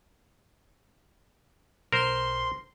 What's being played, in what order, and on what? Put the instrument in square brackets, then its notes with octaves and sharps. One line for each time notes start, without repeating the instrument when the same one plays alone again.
[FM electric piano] B1 [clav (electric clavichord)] A#4 C5 [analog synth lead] C6